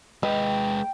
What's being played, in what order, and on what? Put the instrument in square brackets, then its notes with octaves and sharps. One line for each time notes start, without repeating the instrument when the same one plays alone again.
[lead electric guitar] G#3 B4 [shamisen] D#5 [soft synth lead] G5